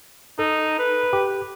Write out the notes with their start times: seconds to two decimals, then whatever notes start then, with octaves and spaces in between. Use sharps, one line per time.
0.39 D#4 A4
0.79 B4
1.13 G4